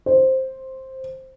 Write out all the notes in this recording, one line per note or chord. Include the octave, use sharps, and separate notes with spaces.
C5